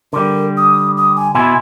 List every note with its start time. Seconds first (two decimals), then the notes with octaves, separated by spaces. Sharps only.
0.13 D3 G3 A#4
0.57 D#6
0.97 D#6
1.16 G#5
1.35 B2 E4 G#5 C6